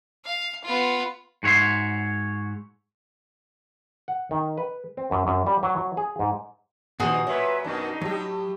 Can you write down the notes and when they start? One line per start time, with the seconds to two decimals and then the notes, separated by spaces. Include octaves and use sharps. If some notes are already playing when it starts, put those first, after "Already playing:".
0.25 F5
0.65 B3 F4
1.43 G#2 F#4 C#5 E5 C6
4.08 F#5
4.31 D#3
4.58 B4
4.97 C4
5.11 F#2
5.27 F#2
5.46 G3
5.63 F#3
5.77 F#3
5.97 G#4
6.19 G#2
7.00 G2 A#2 D#3 F3 F#4 G#4
7.27 A#2 F#3 B4 C#5 E5
7.64 F#2 B2 D4 D#4
8.01 A2 F#3 G4